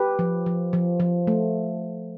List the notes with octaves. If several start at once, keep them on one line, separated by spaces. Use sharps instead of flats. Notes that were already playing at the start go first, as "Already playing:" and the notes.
Already playing: G4 B4
F3
F3
F3
F3
A3